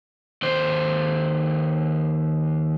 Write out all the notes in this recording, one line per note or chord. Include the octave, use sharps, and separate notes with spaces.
D#2 C5